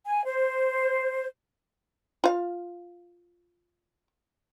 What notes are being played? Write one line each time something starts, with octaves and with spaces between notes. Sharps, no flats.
G#5
C5
F4 F5